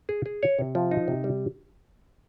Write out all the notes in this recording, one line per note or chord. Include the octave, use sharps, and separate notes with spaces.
G#4
G#4
C#5
C3
F3
D#4
C3
G3